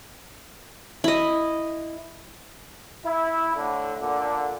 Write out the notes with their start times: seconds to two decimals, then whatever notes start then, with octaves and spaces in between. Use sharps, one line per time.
1.04 E4 D#5
3.05 E4
3.55 A2 D3
3.99 A#2 D3